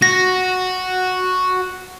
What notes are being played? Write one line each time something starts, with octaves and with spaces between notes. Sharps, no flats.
F#4 A#6